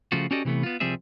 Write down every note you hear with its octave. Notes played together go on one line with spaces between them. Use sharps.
C#3 F3 A3 F4 F#4
C#4 F#4 G4 A4 D5 D#5
C3 E3 A3 B3
B3 F4
C2 F3 G3 C4 G#4 E5